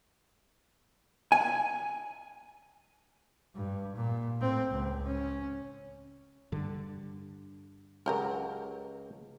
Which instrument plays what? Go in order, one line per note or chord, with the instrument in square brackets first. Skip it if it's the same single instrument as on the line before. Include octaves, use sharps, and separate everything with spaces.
[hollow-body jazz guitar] G#5
[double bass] G2
A#2
A2 C4
C#2
C#4
[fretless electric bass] G2 D3
[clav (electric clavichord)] C#2 F#3 A5 [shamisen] C#4 G4 A#4